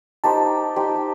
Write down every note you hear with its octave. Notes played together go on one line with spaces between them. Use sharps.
D#4 G4 C5 A5
D#4 G4 C5